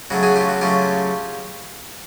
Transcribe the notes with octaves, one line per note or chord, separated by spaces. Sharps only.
C#3 F#3 A3 F#4
F#4 G#4
F4 G4
F#4
C#3 F#3 A3 F4 G4